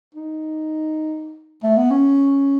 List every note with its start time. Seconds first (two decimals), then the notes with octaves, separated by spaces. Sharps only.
0.15 D#4
1.63 A3
1.77 B3
1.91 C#4